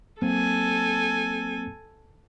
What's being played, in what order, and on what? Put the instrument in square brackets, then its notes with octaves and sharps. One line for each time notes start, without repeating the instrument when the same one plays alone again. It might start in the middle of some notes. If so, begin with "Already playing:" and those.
[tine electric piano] F#3 A#3 C4 [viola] A4 G#5